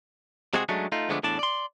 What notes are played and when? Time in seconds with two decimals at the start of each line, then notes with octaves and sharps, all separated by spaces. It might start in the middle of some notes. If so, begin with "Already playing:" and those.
0.54 C3 G#3 C4 F#4 G#4
0.69 F#3 G#3 A3 C#4 D4
0.92 A3 D#4 F4
1.09 D3 F3 G#3 A3 B3 D4
1.23 E2 A2 D4 D5 A5
1.39 D5 C6